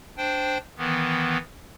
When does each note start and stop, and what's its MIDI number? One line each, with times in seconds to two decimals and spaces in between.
0.17 0.58 62
0.17 0.58 72
0.17 0.58 79
0.78 1.38 51
0.78 1.38 52
0.78 1.38 59